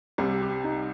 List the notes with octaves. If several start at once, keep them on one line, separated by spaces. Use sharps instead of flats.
C2 C3 G3
G4
D#4